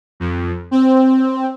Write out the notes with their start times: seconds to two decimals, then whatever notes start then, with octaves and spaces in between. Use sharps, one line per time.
0.20 F2
0.71 C4